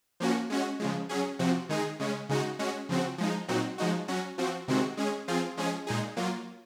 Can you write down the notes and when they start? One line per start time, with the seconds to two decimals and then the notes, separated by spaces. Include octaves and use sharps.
0.20 F3 A#3 C#4 F#4
0.50 G#3 C#4 F#4
0.80 C#3 F3 G#3
1.09 F#3 C#4 G#4
1.39 C3 F3 C4 F#4
1.69 D#3 G#3 D#4 G#4
2.00 C#3 G#3 C#4
2.29 C#3 G#3 D#4 F#4
2.59 G#3 C#4 F#4
2.89 C#3 F3 C4 F#4
3.18 F3 G#3 D#4
3.48 A#2 F#3 C4 D#4 F#4
3.78 F3 G#3 D#4 F#4
4.08 F#3 C#4 F#4
4.38 F3 C4 F#4
4.68 C3 D#3 G#3 C4 F#4
4.97 G#3 C#4 G#4
5.28 F3 C4 F4 G#4
5.57 F3 G#3 C#4 G#4
5.87 A#2 G#3 D#4 G#4
6.17 F#3 A#3 F4